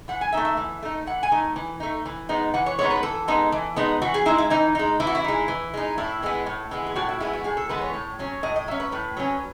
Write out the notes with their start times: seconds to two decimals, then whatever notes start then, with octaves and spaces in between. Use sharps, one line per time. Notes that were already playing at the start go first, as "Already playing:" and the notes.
0.08 E3 F#5
0.21 G#5
0.33 A3 D#4 E5
0.45 E5
0.57 E3
0.83 A3 D#4
1.07 E3 F#5
1.23 G#5
1.32 A3 D#4
1.56 E3
1.80 A3 D#4
2.06 E3
2.29 G#3 B3 D#4
2.54 E3 F#5
2.66 C#5
2.79 G#3 B3 D#4 C#5
2.91 B4
3.03 E3 A4
3.28 G#3 B3 D#4
3.52 E3
3.76 G#3 B3 D#4
4.02 E3 F#4
4.14 G#4
4.26 G#3 D#4 E4
4.38 E4
4.50 E3 D#4
4.75 G#3 D#4
5.00 E3 E4
5.07 F#4
5.15 E4
5.24 G#3 D#4
5.48 E3
5.74 G#3 D#4
5.98 A2 E4
6.22 E3 G#3 B3
6.46 A2
6.71 E3 G#3 B3
6.87 G#4
6.96 A2 F#4
7.09 E4
7.20 E3 G#3 B3 E4
7.33 F#4
7.44 A2 G#4
7.57 A4
7.69 E3 G#3 B3 B4
7.81 C#5
7.94 A2
8.19 F#3 C#4
8.43 A2 D#5
8.56 D#5
8.67 F#3 C#4 E5
8.80 B4
8.92 A2
9.17 F#3 C#4